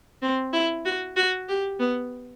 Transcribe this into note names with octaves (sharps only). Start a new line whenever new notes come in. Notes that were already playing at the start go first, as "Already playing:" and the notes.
C4
E4
F#4
F#4
G4
B3